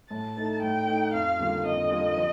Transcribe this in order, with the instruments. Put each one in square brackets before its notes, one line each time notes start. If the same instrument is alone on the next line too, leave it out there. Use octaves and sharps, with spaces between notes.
[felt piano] A2 [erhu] A5
[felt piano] A3 D#4
[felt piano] A2 [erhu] G5
[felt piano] A3 D#4
[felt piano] F2 [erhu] F5
[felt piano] D3 G3 A#3 F4
[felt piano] F2 [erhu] D#5
[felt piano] D3 G3 A#3 F4
F3